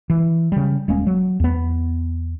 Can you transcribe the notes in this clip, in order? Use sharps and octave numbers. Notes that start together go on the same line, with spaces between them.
E3
C#3 G3
D#1 G#3 A#3 C#4
F#3
E2 B3